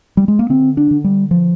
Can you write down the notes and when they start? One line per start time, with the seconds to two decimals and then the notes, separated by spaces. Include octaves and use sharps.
0.17 G3
0.28 G#3
0.39 A#3
0.49 D3 C4
0.77 D4
0.91 D3
1.04 G3
1.31 F3